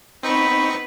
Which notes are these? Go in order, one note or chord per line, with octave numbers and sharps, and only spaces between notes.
B3 C4 D#4 B4 C#6